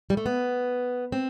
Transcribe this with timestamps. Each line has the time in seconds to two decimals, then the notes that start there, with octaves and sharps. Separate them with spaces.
0.10 G3
0.17 A3
0.26 B3
1.12 C4